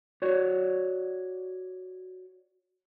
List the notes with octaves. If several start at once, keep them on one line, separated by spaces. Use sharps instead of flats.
F#4 C#5 D5